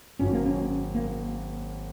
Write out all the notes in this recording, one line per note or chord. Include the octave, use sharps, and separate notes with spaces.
G#1 F#2 F#3 C#4
A#3
C#4
A#3